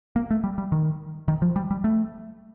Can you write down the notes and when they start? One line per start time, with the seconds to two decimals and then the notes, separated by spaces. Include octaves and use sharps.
0.16 A#3
0.31 A3
0.44 G3
0.58 G3
0.72 D#3
1.28 D#3
1.42 F3
1.56 G3
1.71 G3
1.84 A3